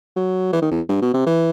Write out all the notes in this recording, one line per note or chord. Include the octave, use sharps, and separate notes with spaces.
F#3
E3
D#3
E2
G2
B2
C3
E3